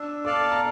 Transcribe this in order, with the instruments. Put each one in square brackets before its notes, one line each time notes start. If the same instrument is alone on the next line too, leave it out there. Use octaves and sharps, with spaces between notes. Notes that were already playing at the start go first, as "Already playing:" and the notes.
Already playing: [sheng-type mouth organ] D4 [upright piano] E6
[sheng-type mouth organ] A4 D5 F5 A5 [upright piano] D6
[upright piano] A#5